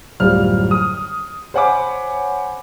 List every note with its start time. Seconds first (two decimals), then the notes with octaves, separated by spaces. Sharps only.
0.20 D1 F#2 G3 F4 C5 F6
0.71 D#6 F6
1.54 C5 C#5 F#5 G#5 B5 D6